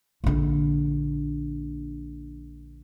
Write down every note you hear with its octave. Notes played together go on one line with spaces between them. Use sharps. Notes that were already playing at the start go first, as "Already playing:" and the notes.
A#1 D3